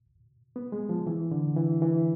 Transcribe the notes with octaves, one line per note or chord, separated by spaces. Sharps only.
B3
G#3
F3
E3
D3
E3
E3